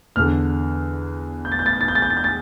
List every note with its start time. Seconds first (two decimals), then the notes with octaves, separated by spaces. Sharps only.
0.16 E2 D3 F6
1.45 G6
1.52 A6
1.59 G6
1.66 A6
1.73 G6
1.81 A6
1.88 G6
1.95 A6
2.02 G6
2.10 A6
2.17 G6
2.24 A6